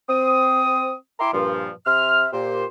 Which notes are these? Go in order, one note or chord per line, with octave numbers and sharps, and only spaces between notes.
C4 D#6
E4 E5 G5 A#5 C6 D6
G2 A#2 F3
C3 E5 C6 F6
A#2 G4 C5